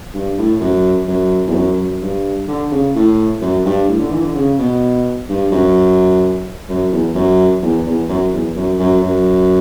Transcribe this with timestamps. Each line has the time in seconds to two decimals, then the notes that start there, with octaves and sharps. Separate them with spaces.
0.14 G2
0.38 A2
0.60 F#2
1.08 F#2
1.47 E2
1.55 F#2
1.78 F#2
2.02 G2
2.48 D3
2.72 C#3
2.95 A2
3.41 F#2
3.65 G2
3.88 A2
3.99 D3
4.11 E3
4.23 D3
4.35 C#3
4.59 B2
5.29 G2
5.52 F#2
6.69 F#2
6.92 E2
7.15 F#2
7.62 E2
7.86 E2
8.09 F#2
8.33 E2
8.55 F#2
8.79 F#2
9.02 F#2